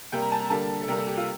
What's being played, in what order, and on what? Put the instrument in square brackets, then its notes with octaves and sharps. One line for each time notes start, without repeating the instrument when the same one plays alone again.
[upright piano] C3 G3 A#3 G5
A#5
A5
A#5
D3 G3 A#3 A5
A4
C3 G3 A#3 A#4
A4
G4
F4